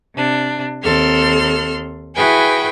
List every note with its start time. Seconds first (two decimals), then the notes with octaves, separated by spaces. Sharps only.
0.14 C3 D4
0.83 D#2 C4 A4 C6 F6
2.15 E4 F#4 G#4 B4 G5 G#5